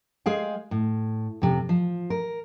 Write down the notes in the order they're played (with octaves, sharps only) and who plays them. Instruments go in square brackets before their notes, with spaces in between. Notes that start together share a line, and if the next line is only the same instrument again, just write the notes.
[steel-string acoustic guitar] G#3 G#4 F5 G5
A2
F2 C3
F3
A#4